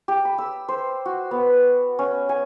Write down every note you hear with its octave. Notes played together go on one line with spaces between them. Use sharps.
G4
B5
E6
C5
F#4
B3
C#4
G#5